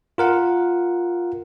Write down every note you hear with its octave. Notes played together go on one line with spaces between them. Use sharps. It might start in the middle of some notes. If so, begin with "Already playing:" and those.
F4 A#4 F#5